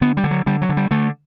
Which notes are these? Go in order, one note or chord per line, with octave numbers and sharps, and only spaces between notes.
D3 B3
G3
D3
F#3
D3 G3
F#3
D3
G3
D3 A3